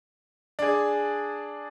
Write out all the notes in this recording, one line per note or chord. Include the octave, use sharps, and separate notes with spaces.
D4 G#4